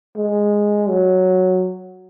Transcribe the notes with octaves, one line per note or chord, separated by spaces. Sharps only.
G#3
F#3